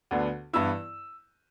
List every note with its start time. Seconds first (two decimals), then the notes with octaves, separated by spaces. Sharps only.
0.11 D2 D3 B3 D4
0.53 G2 E3 B3 E4 E6